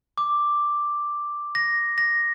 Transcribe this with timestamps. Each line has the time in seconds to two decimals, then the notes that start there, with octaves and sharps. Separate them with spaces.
0.18 D6
1.55 A#6
1.98 A#6